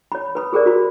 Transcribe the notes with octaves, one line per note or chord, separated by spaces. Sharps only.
C#5 B5
B4 B5 D#6
G4 G#4 A#4 C5 D5
F#4 B5